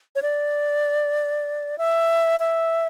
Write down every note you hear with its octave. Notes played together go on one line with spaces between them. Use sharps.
C#5
D5
E5
E5